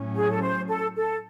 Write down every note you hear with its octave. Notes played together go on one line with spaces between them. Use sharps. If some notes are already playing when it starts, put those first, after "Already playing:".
Already playing: A2 F#3 C#4
G#4
A4
C5
A4
A4